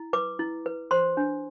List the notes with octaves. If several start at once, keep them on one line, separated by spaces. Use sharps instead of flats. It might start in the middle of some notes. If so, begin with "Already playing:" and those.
Already playing: E4
B4 D6
E4
B4
C5 C6
D4